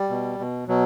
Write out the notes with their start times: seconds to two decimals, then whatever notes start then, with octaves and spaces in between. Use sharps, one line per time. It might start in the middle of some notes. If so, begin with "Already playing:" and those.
Already playing: G3
0.10 B2
0.39 B2
0.68 B2 F#3